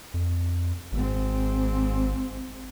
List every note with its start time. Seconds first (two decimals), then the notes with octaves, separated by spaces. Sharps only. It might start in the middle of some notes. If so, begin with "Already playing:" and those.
0.14 F2
0.92 G#1 G#2 C4